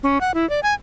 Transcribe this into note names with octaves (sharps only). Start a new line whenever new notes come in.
C#4
F#5
E4
D5
G#5